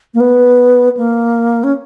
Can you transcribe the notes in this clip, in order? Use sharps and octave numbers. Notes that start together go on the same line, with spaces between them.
A#3
B3
A#3
C#4